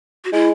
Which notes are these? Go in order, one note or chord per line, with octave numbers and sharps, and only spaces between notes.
F#4
G#3 E4